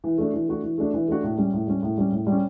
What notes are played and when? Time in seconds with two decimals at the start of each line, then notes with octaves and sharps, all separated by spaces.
0.04 E3
0.18 A3 D4 F#4
0.34 E3
0.48 A3 D4 F#4
0.63 E3
0.78 A3 D4 F#4
0.94 E3
1.08 A3 D4 F#4
1.23 A2
1.38 G3 C#4
1.53 A2
1.67 G3 C#4
1.83 A2
1.98 G3 C#4
2.12 A2
2.27 G3
2.32 C#4